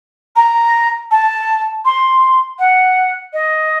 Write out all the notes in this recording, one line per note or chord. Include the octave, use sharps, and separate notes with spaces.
A#5
A5
C6
F#5
D#5